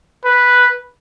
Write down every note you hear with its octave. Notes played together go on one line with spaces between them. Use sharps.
B4